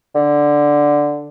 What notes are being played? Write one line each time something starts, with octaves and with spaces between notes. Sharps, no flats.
D3